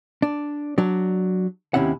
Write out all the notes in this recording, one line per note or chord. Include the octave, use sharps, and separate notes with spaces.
D4
F#3 D4
D#2 C3 C#4 E4 F#5